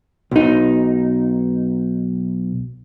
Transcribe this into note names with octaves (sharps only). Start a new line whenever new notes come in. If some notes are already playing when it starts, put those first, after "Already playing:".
B1 D#4